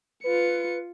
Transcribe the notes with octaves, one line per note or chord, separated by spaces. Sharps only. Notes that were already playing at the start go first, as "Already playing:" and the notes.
F4 B4 C#7